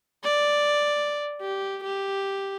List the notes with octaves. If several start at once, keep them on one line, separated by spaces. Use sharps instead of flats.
D5
G4
G4